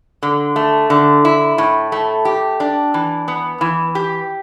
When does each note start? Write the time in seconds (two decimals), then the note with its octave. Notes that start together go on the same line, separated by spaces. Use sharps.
0.23 D3
0.56 A3
0.90 D3
1.25 E4
1.58 A2
1.92 A3
2.25 G4
2.60 D4
2.94 E3
3.28 B3
3.61 E3
3.95 G4